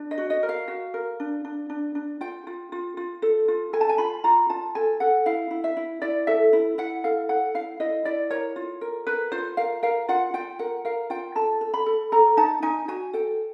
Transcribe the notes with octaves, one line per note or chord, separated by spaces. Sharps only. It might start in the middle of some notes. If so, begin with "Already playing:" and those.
Already playing: D4
D#5
F#4
D#5
A#4
F5
F#4
A#4
D4
D4
D4
D4
F4 G5
F4
F4
F4
A4
F4
A4 G#5
A5
G#5
F4 B5
F4 A#5
F4 A5
A4 G#5
A4 F#5
E4 F5
E4
E5
E4
E4 D5
A4 E5
E4
E4 F#5
A4 F5
A4 F#5
E4 F5
E4 D#5
E4 D5
A#4 C#5
F4
A#4
A#4 B4
F4 C5
A#4 F5
A#4 F5
F4 F#5
F4 G5
A#4 F#5
A#4 F5
F4 G5
A4 A5
A4
B5
A4
A4 A#5
D#4 A5
D#4 G#5
F#4 G#5
A4 G5